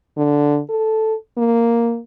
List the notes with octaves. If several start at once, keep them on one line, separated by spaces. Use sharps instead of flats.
D3
A4
A#3